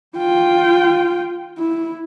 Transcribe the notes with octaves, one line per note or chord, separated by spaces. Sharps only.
F4 G5
E4